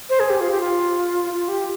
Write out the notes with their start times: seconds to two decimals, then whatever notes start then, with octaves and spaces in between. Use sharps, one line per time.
0.10 C5
0.20 G#4
0.30 G4
0.40 F4
0.50 G4
0.61 F4
1.33 F4
1.48 G4